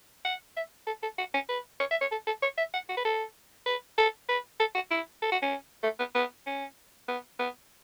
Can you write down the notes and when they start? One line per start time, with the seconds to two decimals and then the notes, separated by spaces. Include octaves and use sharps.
0.25 F#5
0.57 E5
0.87 A4
1.03 A4
1.18 F#4
1.34 C#4
1.49 B4
1.80 C#5
1.91 E5
2.01 C#5
2.11 A4
2.27 A4
2.42 C#5
2.58 E5
2.73 F#5
2.89 F#4
2.97 B4
3.05 A4
3.66 B4
3.98 A4
4.29 B4
4.60 A4
4.75 F#4
4.91 E4
5.22 A4
5.32 F#4
5.42 C#4
5.83 A3
5.99 B3
6.15 B3
6.46 C#4
7.08 B3
7.39 B3